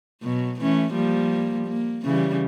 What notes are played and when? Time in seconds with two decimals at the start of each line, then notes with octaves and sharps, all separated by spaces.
0.22 B2 F#3
0.61 E3 A3 C#4
0.92 F3 G3 A#3
1.66 A#3
2.05 C#3 E3 G3